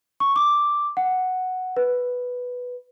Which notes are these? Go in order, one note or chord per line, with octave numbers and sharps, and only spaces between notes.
C#6
D6
F#5
B4